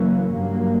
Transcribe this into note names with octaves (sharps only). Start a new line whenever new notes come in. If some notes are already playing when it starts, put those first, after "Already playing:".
Already playing: F#1 F#2 E3 A#3 C#4
G2 F#3 A#3